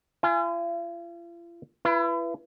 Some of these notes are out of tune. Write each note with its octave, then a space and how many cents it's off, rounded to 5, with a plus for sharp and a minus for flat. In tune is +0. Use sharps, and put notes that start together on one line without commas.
F4 -45 G#5 +0
E4 +35 B4 +0